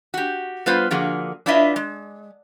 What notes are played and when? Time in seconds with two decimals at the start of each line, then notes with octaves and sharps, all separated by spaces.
0.14 F#4 G4
0.66 G3 B3 F4 B4 C5
0.91 D3 F3 A#3 F#4 G#4
1.46 D4 E4 F4 B4 D#5 E5
1.76 G#3